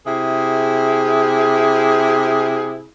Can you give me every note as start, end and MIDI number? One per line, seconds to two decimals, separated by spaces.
0.06 2.85 48
0.06 2.85 64
0.06 2.85 68